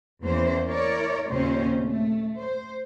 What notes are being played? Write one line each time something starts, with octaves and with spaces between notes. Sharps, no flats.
E2 E3 A#3 C#4 C5
E4 A#4 C#5 D5
D#2 A#2 C#3 C4 C#4 C5
A3
C5